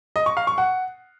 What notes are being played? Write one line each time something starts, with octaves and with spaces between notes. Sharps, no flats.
D#5
C#6
F5
C#6
F#5